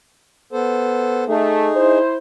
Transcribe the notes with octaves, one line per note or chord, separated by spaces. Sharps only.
B3 A4 C5
A3 D#4 G#4
E4 C5